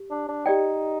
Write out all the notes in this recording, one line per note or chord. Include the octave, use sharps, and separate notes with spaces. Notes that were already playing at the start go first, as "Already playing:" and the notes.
Already playing: G4
D4
D4
D#4 G4 D5 G5